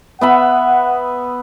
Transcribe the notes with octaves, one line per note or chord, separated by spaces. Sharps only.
B3 E5 F#5 B5